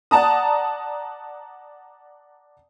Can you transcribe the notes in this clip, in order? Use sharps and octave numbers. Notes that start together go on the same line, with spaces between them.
D5 F#5 A5 A#5 D#6